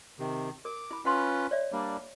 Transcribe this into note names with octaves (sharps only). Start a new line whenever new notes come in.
C3 D#3
A#4 D6
E4 B5
C#4 F4 B4 F#5 B5 C6
C#5 D5 E5
G3 A#3 D4